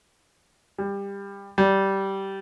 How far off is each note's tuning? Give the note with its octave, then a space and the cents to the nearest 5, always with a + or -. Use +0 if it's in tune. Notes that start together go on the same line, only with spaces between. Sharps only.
G3 +20
G3 -15